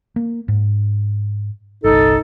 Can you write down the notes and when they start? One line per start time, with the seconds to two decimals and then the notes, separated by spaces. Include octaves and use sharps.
0.16 A#3
0.48 G#2
1.84 G1 C2 D#4 A4